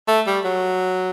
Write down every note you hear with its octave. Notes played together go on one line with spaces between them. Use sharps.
A3
G3
F#3